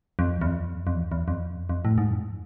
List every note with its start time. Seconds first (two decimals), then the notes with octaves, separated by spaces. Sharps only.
0.19 F2
0.41 E2
0.46 F2
0.87 F2
0.95 E2
1.12 E2
1.28 F2
1.69 F2
1.85 A2
1.98 G#2
2.11 F2